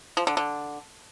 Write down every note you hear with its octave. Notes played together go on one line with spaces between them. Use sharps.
F3
D3
D3